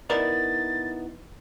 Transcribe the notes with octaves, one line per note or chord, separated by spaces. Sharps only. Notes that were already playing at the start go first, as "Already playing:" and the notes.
B3 D#4 E4 A#4 D5 E5 A6